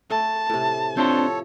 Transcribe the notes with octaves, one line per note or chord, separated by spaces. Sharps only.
A3 A5
A2 C3
F3 C4 D4 A4 C5 C#5